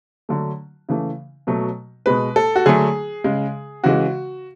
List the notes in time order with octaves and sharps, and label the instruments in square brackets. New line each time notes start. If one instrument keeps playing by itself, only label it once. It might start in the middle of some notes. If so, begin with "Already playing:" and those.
[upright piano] D3 F#3 A3
C#3 E3 A3
B2 F#3 A3
B2 G#3 B4
A4
F#4
D3 F#3 A3 G#4
C#3 G#3
C#3 E3 G#3 F#4